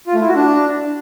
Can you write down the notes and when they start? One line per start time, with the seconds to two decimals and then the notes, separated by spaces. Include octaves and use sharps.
0.07 F4
0.14 A3
0.21 E4
0.28 F#4
0.35 D4